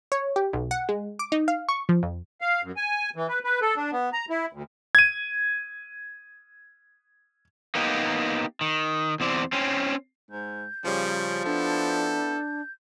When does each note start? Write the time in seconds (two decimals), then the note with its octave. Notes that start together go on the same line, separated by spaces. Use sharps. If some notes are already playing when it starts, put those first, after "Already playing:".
0.12 C#5
0.36 G4
0.53 B1
0.71 F#5
0.89 G#3
1.19 D6
1.32 D#4
1.48 F5
1.69 C#6
1.89 F3
2.03 F2
2.41 F5
2.63 F#2
2.77 G#5
3.16 E3
3.29 B4
3.44 B4
3.62 A4
3.77 D4
3.92 B3
4.13 A#5
4.30 E4
4.53 D2
4.95 G#6 D#7
7.75 A#3 B3 D#4 G4
8.61 D#3
9.20 E2 C4 D5
9.52 C4 C#4
10.31 G#2 G6
10.85 C#3 F3 G3
11.45 B3 D4 E4 A4
11.88 G6